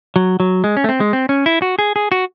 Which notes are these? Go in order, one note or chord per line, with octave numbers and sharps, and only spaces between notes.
F#3
F#3
G#3
C#4
A3
C4
G#3
C4
C#4
E4
F#4
G#4
G#4
F#4